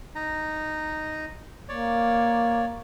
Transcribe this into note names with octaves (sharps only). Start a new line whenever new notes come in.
D#4 A#5
A#3 C#5 D5